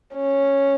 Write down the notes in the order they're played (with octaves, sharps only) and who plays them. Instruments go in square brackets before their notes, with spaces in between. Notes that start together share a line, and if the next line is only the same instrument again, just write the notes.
[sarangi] C#4